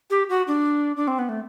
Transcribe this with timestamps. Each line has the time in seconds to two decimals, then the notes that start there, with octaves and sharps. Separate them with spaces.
0.10 G4
0.29 F#4
0.48 D4
0.96 D4
1.08 C4
1.19 B3
1.29 A3